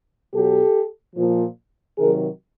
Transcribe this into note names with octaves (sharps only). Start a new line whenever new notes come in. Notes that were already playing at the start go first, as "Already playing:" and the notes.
B2 F#3 G4 A4
A#2 F3
C3 D#3 F#3 G#4 A#4